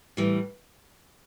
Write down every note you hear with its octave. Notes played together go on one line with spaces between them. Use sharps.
A2 E3 G3